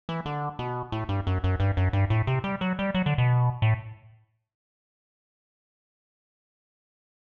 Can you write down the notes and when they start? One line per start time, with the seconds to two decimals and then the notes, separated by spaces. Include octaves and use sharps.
0.09 E3
0.26 D3
0.59 B2
0.92 A2
1.09 G2
1.27 F#2
1.44 F#2
1.60 G2
1.77 F#2
1.93 G2
2.10 A2
2.27 C3
2.44 G3
2.61 F#3
2.79 G3
2.95 F#3
3.06 D3
3.18 B2
3.62 A2